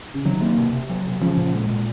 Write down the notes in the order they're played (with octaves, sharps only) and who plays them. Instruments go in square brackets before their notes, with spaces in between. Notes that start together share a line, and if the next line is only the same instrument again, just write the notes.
[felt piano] C#3
[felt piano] C3 D#3 [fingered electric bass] F#3
[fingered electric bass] A#3
C3
C3
F#3
C3
[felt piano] C#3 F3 [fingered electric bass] C#4
[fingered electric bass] A#2
G#3
A#2